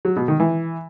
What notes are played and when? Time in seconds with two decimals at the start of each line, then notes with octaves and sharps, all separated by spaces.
0.05 F#3
0.16 B2
0.28 D#3
0.40 E3